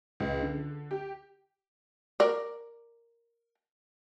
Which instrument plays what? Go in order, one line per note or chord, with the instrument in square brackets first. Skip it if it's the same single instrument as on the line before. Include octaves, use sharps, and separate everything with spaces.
[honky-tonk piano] C#2
D3
G4
[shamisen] A#4 D5